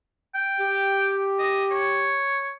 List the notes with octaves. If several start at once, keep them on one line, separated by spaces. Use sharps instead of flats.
G5
G4
D#5
C#5